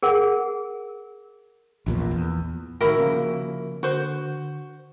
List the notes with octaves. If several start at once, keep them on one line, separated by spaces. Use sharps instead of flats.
G#4 A#4 F#5
A#1 E2 A#2
E2
A2 D#3 E4 F#4 A#4
C#3 F3 A#3
D3 F#4 C5